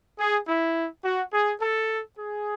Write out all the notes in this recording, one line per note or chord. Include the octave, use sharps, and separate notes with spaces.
G#4
E4
F#4
G#4
A4
G#4